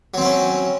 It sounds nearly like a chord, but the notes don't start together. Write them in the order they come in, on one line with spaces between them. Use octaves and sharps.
F#3 C4 E4 C#4